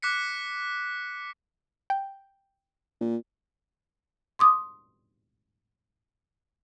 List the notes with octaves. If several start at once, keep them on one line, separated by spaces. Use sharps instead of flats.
D6 F#6 B6 C#7
G5
A#2
C6 D6 D#6